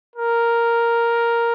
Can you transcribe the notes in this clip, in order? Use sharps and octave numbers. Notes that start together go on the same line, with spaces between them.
A#4